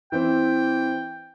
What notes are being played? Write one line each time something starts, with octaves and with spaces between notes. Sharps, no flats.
E3 C4 G5